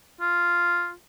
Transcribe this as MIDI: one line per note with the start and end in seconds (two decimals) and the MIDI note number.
0.21 0.93 65